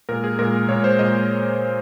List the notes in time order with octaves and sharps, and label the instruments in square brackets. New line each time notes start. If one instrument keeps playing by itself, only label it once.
[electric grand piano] A#2 G#3 A#4
G#4
A#2 G#3 A#4
A#2 G#3 C#5
C5
A#2 G#3 D#5